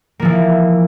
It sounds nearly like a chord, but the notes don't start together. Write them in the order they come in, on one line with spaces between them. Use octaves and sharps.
A#3 F3 E3